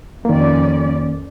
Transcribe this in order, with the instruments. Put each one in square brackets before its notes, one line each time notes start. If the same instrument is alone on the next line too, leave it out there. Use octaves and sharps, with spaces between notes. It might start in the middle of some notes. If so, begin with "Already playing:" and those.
[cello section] F2 C#4 D5 [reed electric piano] D#3 A#3